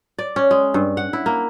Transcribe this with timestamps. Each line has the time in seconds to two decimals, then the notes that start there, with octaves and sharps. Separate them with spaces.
0.18 D5
0.36 C#4
0.51 G#3
0.74 G2
0.97 F#5
1.13 E4
1.26 A#3